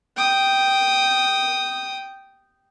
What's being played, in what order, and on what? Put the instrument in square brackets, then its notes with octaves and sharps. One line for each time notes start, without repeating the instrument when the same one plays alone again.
[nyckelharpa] G5 D#6